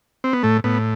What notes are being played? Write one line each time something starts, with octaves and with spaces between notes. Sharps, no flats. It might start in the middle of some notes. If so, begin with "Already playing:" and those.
C4
B3
A2 A3
A2 B3